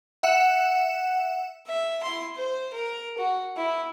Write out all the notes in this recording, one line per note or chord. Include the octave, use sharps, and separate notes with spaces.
E5 F#5 C#7 E7
E5
E4 C6
C5
A#4
F#4
E4